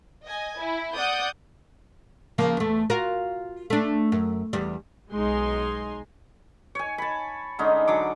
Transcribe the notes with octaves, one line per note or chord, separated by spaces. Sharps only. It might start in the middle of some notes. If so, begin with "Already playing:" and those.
D#5 G#5
E4
D5 F#5 D#6 G6
C#3 F3 A#3
E2 A3
F4 F#4 A#4
A3 D4
F#2
E2 G3
B1 G#3 D#4 G#5 C6
C#5 G#5
A5 B5
D3 G#3 C#4 D#4
D3 F#3 D6